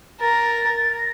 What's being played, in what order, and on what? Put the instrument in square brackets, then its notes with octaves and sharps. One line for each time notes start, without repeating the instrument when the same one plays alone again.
[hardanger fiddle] A#4 [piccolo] A6
[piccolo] A#6